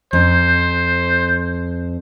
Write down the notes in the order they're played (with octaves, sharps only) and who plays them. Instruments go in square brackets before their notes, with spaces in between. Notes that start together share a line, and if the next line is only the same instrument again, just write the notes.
[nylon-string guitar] F2 [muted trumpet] C5